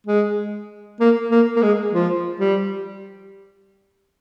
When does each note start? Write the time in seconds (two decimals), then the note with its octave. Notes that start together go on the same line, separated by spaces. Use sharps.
0.07 G#3
1.00 A#3
1.31 A#3
1.56 A#3
1.63 G#3
1.94 F3
2.40 G3